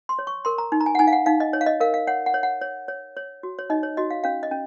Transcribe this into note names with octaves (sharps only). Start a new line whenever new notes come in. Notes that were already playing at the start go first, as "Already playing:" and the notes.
C6
C#5
C#6
A#4 C6
A#5
D#4
A#5
G#5
F#5
D#4 G#5
F5
F#5
D#4 F5
D#5
C#5
F5
D#5
A#4 F5
F5
C#5 F#5
F#5
C#5
F#5
C#5
C#5
C#5
F#4
C#5
D#4 D#5
C#5
F#4 D#5
F5
C#4 F5
D#5
C#4